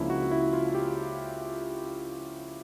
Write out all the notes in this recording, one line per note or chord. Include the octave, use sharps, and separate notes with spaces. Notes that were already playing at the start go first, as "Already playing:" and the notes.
Already playing: C#2 C#3 F3 A#3 D4 E4
F#4
E4
F4
G4